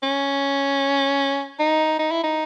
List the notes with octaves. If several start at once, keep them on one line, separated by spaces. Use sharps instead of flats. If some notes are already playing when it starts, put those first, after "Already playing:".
C#4
D#4
D#4
E4
D#4